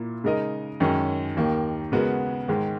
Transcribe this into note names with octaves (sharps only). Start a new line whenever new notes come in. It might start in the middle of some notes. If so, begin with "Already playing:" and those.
Already playing: A#2 A#3 E4
C#3 G#3 D#4 A#4 D#5
F#2 D#3 G#3 C#4
D#2 D#3 A#3
C#3 G#3 B3 F#4 A#4
G#2 D#3 G#3